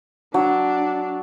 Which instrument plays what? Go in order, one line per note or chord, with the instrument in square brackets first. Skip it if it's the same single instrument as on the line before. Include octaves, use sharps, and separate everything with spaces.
[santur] F#3 [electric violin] D4